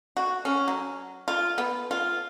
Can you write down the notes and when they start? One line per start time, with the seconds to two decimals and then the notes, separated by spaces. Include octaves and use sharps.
0.17 F#4
0.45 C#4
0.68 F#3
1.28 F4
1.58 B3
1.91 F4